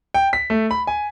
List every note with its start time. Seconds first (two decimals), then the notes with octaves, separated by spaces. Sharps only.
0.14 G5
0.33 B6
0.50 A3
0.71 B5
0.87 G#5